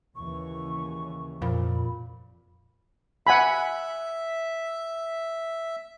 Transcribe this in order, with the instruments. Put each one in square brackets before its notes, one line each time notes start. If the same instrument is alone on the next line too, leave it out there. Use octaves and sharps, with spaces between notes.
[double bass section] D#2 C#3 E3 [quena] C#6
[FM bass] F2 [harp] A#2 [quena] B5
[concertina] E5 [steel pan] F#5 G#5 B5